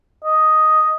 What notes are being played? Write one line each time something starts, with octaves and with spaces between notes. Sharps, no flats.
D#5